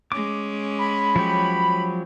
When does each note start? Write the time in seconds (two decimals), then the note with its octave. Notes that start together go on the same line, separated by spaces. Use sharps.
0.12 G#3 C#4 D6
0.78 B5
1.16 F3 F#3 G4